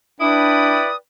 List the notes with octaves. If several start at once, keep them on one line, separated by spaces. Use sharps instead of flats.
D4 E4 B4 D5 G5 D#6